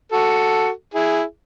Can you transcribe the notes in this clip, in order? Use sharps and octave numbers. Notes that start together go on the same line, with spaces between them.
F#4 A4
E4 G#4